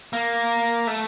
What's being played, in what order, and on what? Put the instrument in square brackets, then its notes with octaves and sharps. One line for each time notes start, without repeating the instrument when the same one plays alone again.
[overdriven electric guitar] A#3
A3